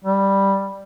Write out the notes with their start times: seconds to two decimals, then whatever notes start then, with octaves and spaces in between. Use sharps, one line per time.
0.04 G3